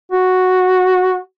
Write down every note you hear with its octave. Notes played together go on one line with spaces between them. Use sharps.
F#4